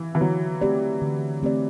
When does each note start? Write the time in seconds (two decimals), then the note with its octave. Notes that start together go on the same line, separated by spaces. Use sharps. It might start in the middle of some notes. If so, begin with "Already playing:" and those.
Already playing: E3
0.15 E3
0.21 D3 F#3
0.62 A3 C4 G4 D5
1.02 D3
1.42 A3 C4 G4 D5